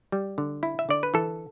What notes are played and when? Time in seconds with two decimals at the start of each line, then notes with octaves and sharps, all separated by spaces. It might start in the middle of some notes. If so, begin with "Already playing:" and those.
0.12 G3
0.38 D3
0.63 E4
0.79 E5
0.89 D3 D5
1.03 B4
1.14 E3 A4